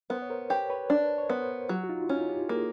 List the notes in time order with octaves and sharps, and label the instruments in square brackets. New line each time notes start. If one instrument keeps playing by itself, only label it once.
[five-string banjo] B3 [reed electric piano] A#4 C5
[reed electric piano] C#5
A#4 C5
[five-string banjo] G4 [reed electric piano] B4 C#5
[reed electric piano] B4 C#5
[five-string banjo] D4
[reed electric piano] C#5
[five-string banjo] B3 [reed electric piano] A#4 C5
[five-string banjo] F#3 [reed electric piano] F4 G4
[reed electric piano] F#4
D#4 F4
E4
[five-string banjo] C#4 [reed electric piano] D#4 F4
[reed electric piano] F4 G4
[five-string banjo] A#3 [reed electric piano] F#4 G#4